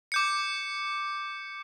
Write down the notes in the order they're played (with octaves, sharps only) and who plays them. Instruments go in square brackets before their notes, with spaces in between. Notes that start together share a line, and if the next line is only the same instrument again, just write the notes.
[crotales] D6 G6 C#7